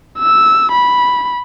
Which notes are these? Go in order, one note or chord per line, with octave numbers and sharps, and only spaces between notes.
E6
B5